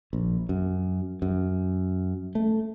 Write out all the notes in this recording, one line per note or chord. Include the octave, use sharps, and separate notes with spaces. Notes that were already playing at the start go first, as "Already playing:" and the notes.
A#1
F#2
F#2
A3